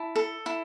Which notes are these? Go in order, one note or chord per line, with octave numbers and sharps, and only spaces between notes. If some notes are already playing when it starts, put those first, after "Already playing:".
Already playing: E4 A5
A4
E4